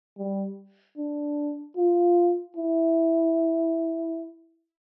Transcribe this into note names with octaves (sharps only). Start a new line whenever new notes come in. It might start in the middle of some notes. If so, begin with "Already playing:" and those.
G3
D4
F4
E4